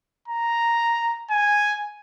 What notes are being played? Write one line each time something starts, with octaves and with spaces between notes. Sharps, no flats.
A#5
G#5